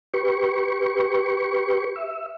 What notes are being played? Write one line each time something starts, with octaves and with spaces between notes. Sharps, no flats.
G4 B4 C#6
E5